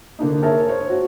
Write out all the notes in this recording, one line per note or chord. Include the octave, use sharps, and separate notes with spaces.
D3 A#3 D4 D#4
G#4 A#4 C#5 E5 A5
C5 C#5
F#4